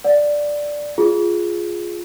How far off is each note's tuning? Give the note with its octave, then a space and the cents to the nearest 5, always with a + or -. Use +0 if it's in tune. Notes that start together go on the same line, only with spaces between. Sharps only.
D5 +0 F#5 -30
F4 +0 G#4 +0